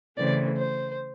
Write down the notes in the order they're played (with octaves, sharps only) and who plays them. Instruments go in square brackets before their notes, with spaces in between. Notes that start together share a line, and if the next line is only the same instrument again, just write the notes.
[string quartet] C#3 E3 A3 C4 D5
C5